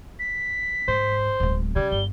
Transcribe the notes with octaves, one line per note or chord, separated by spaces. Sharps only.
B6
G#2 C5
D1 G#3
C#3 G3 G#6
G1 G7